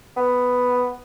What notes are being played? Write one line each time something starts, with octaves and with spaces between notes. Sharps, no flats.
B3